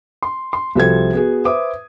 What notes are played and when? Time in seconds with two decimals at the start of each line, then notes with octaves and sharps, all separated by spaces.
0.23 C6
0.53 C6
0.75 C2 F3 F#4 A4 C5 G#6
1.13 B3 F#4 G#4
1.45 B4 C5 E5 D6 D#6